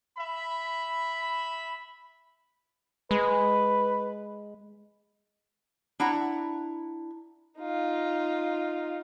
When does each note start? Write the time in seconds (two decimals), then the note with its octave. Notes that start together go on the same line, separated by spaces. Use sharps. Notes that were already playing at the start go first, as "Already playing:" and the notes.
0.17 E5 B5
3.11 G#3 B4
6.00 D4 E4 F#5 A#5
7.59 D#4 F4